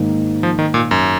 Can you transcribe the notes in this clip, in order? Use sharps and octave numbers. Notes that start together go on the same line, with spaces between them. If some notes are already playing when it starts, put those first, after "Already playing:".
Already playing: G#2 D#3 A#3
F3
D#3
A#2
F#2